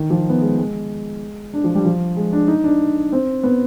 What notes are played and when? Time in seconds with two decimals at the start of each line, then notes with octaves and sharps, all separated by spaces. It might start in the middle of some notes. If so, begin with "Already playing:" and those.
Already playing: D#3
0.10 F3
0.29 B3
0.42 G#3
0.58 G#3
1.54 D4
1.64 F3
1.75 G3
1.85 F3
2.17 G#3
2.33 D4
2.48 D#4
2.64 D4
3.13 C4
3.43 B3